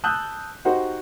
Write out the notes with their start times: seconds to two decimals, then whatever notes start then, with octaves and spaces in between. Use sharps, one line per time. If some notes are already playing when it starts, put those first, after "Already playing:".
0.04 A5 D#6 E6 F#6 G6
0.65 D#4 F#4 G4 C5 D#5 F#5